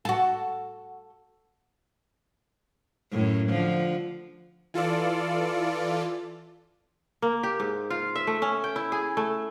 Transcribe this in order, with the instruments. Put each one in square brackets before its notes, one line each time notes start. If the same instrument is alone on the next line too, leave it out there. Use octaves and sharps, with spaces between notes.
[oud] F#4 A4
[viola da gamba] F#2 A2
D3 F3
[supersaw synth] E3 F4 A4 D5
[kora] A#3
G4
G#2
F4
E5
A3
C#4
G5
E4
G#4
A3